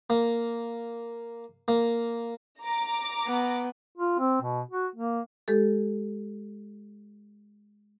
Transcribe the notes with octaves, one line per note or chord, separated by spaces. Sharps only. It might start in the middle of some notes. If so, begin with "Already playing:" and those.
A#3
A#3
A#5 D6
B3
F4
C4
B2
F#4
A#3
G#3 G4 A4